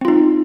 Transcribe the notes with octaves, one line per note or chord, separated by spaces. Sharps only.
C4 D#4 F4